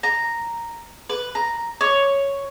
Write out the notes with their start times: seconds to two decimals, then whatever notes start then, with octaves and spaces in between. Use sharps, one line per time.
0.03 A#5
1.10 B4
1.35 A#5
1.81 C#5